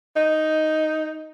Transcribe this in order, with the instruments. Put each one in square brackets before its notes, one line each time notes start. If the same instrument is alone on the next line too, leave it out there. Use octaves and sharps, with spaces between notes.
[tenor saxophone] D#4